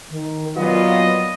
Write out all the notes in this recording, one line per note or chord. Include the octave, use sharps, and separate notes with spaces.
D#3
A#2 F#3 B3 F4 D#5